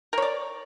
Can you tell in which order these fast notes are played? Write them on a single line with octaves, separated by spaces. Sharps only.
A#4 C#5 D5